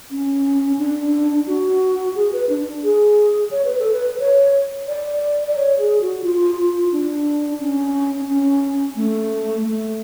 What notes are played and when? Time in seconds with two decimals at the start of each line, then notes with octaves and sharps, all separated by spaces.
0.11 C#4
0.79 D4
1.47 F#4
2.15 G#4
2.32 B4
2.49 D4
2.83 G#4
3.51 C#5
3.65 B4
3.79 A4
3.92 B4
4.20 C#5
4.88 D5
5.48 D5
5.56 C#5
5.78 G#4
6.01 F#4
6.24 F4
6.92 D4
7.60 C#4
8.28 C#4
8.96 A3
9.64 A3